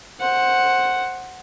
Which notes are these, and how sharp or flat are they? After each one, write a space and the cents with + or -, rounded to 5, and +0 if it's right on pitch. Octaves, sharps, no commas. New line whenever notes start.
C5 +15 F#5 +0